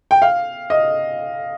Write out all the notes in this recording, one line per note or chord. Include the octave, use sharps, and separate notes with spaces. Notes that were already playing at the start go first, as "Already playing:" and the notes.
G5
F5
D#5